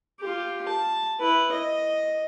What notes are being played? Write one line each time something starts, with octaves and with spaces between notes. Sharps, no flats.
F4 G4
A5
E4 B4
D#5